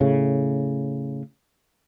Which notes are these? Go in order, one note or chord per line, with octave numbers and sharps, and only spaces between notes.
A2 C#3